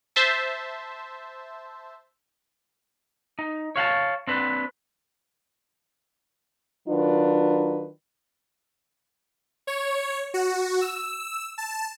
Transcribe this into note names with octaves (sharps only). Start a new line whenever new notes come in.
C5 E5 A5
D#4
C#5 F5 F#5 A5
C4 D4 B4
D#3 F#3 D4 F4 B4
C#5
F#4
E6
A5